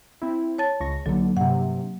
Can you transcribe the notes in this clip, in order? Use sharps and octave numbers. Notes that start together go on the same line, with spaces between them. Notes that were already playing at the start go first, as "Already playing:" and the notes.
C4 E4
C#5 A5 A6
C#2 C#6 A#6
B1 D3 F#3 A#3
G2 C3 F#5